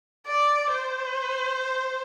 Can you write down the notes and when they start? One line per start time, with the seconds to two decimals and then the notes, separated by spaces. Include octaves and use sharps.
0.27 D5
0.71 C5